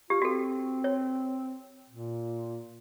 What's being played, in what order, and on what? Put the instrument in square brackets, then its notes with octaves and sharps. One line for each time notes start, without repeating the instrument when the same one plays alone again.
[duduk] F4 [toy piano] G4
[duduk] C4 [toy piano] F#4 A4
[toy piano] C#5
[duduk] A#2